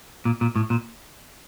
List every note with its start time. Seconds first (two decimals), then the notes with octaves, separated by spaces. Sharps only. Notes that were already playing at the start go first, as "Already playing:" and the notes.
0.25 A#2
0.41 A#2
0.56 A2
0.70 A#2